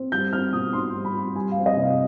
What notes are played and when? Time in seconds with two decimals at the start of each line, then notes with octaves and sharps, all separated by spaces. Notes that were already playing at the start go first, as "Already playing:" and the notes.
Already playing: C4
0.12 G3 G6
0.32 C4 F6
0.52 B2 D#6
0.73 D#4 C6
0.94 G3
1.05 B5
1.15 C4
1.35 G3 G#5
1.52 F5
1.57 C4
1.66 D#5
1.77 C3
1.82 F5